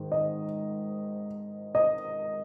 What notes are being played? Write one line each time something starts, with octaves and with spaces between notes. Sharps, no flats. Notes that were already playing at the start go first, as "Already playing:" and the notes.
Already playing: G#2 D#3
D#5
D#5